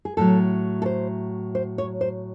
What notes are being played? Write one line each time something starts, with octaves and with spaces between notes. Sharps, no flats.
G#4
A2 F#3 A4
A4
C5
C5
C#5
C5